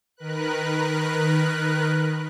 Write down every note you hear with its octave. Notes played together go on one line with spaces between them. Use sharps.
D#3 A#4 B4 F#6